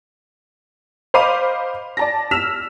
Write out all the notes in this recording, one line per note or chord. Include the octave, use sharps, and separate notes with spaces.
C5 D#5 F5 B5 D6 D#7
D5 A5 A#6
E6 F6 B6 E7 F7